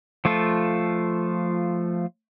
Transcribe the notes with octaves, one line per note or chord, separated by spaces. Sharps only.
F3 A3 F4 A4